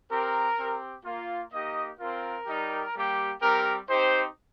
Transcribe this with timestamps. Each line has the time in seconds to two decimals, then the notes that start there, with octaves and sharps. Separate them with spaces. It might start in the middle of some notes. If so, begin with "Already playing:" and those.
0.10 C4 G4 A#4
0.57 C4 G4
1.05 A#3 F4
1.52 A#3 D#4 G4 D#5
1.99 C4 F4 A#4
2.47 G3 D#4 G4
2.94 G3 A#3 G4
3.41 G3 C4 G4 A#4
3.88 C4 D#4 G4 C5